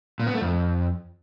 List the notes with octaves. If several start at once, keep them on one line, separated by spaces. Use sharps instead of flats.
A#2
B3
A3
F2